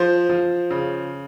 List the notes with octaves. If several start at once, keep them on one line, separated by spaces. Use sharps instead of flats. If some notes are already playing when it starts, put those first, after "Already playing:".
Already playing: F3 C5 C6
F3
C#3